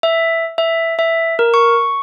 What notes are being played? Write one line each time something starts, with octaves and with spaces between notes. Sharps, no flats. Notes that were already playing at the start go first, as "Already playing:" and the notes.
E5
E5
E5
A#4
C#6